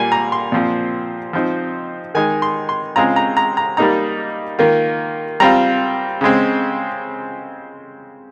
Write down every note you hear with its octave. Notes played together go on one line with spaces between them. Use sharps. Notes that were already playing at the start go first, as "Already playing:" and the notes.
Already playing: A#2 G3 A#3 G#5
A#5
C6
A#2 F3 C4
F3 C4 D#4
D#3 G#3 D#4 G#5
C6
C6
C#3 G#3 C4 F4 A#5
A#5
A#5
A#5
G3 A#3 D#4 A#5
D#3 A#3 F4
G3 C4 F4 A#5
C#3 G#3 C4